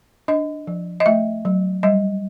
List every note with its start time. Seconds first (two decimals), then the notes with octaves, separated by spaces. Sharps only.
0.28 D4 D#5
0.67 F3
1.00 D#5
1.06 A3 E5
1.45 F#3
1.83 G3 D#5